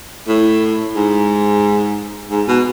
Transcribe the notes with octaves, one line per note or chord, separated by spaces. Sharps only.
A2
G#2
G#2
B2